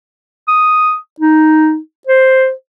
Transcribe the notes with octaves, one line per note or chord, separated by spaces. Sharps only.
D#6
D#4
C5